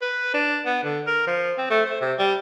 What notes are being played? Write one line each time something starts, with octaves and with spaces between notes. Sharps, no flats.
B4
D4
B3
D3
A#4
F3
C4
A3
C5
C3
G3